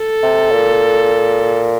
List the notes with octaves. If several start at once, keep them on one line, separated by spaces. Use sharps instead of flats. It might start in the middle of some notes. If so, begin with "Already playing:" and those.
Already playing: A4
C3
A#2